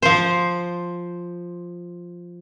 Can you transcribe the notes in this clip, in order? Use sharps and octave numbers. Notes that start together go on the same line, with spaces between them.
F3 C5